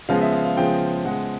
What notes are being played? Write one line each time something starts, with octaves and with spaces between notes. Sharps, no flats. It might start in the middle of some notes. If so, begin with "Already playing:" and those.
C#3 F3 G#3 B3 F5
E5
F5
F5
C#3 F3 G#3 B3 G5
C#3 F3 G#3 B3 F#5